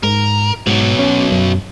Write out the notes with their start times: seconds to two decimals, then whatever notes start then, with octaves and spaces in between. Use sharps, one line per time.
0.03 G#2 A#4
0.67 G#2 B2 F#3
0.99 C#4
1.31 F#2